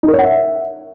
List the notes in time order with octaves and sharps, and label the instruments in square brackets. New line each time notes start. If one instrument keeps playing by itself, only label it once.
[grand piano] D#4
A#4
C#5
F#5
E5